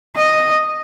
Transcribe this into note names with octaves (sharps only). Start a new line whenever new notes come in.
D#5